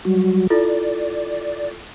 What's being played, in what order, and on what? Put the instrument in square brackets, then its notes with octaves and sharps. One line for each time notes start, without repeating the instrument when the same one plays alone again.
[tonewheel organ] F#3 G3 F#4
[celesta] E4 F4 A4 [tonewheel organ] D5